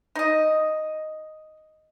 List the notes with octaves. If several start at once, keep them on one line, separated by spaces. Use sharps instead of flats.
D#4 D#5